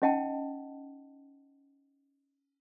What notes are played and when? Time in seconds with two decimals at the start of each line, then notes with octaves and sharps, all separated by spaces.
0.02 C#4 D#4 D#5 F#5 G5 A5